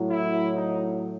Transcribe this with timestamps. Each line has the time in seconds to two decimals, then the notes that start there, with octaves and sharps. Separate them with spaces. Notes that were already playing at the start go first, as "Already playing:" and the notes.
Already playing: A2 F#3
0.08 E4
0.52 D#4